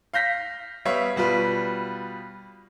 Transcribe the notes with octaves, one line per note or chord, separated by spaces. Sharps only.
F5 G6 A#6 B6
G3 B3 C#5 E5 F5
B2 G3 F4 B4